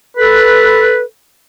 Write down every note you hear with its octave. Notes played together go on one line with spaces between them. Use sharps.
A4 B4